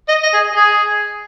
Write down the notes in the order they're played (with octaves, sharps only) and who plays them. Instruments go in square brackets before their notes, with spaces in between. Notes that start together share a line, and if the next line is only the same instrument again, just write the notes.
[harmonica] D#5
D#5
G#4
G#4